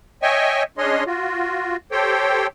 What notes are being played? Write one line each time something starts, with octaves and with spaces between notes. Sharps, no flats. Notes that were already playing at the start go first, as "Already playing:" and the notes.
C#5 D#5 E5 G5 G#5 C#6
C#4 D4 G#4 C#5 D#5 C6
F4 F#4
G4 A4 C5 C#5 G5